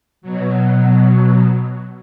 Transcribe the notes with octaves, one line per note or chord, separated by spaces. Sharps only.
B2 F#3